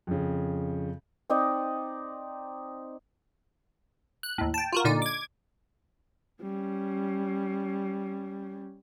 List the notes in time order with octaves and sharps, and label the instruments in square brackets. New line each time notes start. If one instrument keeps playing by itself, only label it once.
[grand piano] F2 C#3
[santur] C4 D#4 D5 D#5
[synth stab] F#6
D#2 A2
G5 A5
F4 F#4 A#4
A#2 D3 D#4 D5
D6 G#6
[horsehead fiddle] G3 C#4